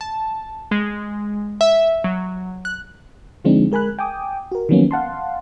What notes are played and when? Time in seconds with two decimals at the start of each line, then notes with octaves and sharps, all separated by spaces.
0.01 A5
0.71 G#3
1.61 E5
2.04 F#3
2.65 F#6
3.45 D3 F3 G#3 C4 D4 D#4
3.72 G#3 A#4 G#5 B5 F#6
3.99 G5 G#5 D6 D#6
4.52 F#4 A#4
4.69 D#3 F3 F#3 A#3 B3 C#4
4.91 F5 F#5 A5 C6